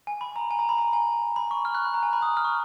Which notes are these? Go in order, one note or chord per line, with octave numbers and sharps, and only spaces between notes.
G#5
B5
A#5
G#5
A#5
B5
A#5
G#5
B5
C#6
F6
F#6
B5
A#5
G#5
B5
D#6
F6
C#6